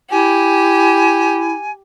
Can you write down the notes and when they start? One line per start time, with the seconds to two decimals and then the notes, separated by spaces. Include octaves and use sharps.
0.11 E4 G4 G#5